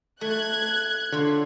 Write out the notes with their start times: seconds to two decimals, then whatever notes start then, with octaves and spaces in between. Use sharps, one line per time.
0.21 A3 F#6 G#6
1.12 D3 F4 C#5